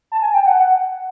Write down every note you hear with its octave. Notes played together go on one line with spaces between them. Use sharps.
A5
G#5
G5
F#5